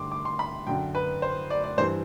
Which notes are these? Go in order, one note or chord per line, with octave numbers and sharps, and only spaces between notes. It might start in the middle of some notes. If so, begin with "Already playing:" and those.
Already playing: G2 D3 C6 D6
D6
C6
B5
F#2 D3 G5
B4
C5
D5
D5
G2 E3 C5